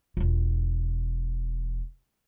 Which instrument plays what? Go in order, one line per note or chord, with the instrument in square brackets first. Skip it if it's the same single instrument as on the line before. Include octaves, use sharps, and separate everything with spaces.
[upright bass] E1 F4